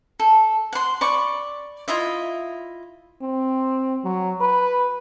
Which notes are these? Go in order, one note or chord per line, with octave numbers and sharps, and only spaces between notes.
A4
F#5 C6
D5 B5 C#6
E4 F4 D#5 E5
C4
F#3
B4